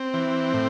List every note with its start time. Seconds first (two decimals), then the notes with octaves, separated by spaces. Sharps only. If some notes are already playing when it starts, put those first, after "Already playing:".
Already playing: C4
0.14 E3
0.53 A2